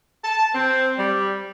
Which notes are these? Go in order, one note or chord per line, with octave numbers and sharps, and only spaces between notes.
A5
C4
G3